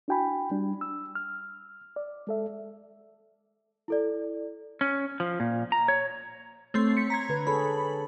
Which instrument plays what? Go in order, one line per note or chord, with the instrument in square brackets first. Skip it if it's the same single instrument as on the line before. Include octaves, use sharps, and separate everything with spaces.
[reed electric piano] D4 E4 F#4 G5 G#5 B5
G3 D4
E6
F6
D5
G#3 A4 E5
[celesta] E4 A4 D5
[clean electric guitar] C#4
F3
A#2
A#5
C#5
[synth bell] A3 C4 C6 [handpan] C#5
[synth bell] B6 C#7
A#5 G#6
[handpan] D3 B4
[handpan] G#4 A4 C#5 [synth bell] B5